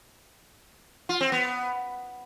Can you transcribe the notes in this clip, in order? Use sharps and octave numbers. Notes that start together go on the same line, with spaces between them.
F4
C4
B3